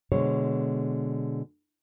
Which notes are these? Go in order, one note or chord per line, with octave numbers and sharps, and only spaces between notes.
B2 D3 G#3 C5 C#5